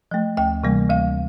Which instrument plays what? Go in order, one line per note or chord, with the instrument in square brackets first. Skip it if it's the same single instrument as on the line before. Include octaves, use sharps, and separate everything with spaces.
[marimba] F3 A3
D2 G5
C3 E3 G3 A#3
D2 F5